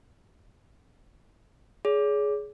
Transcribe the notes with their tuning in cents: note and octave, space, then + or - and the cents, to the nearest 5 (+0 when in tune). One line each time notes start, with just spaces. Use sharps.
G#4 +10 C#5 +40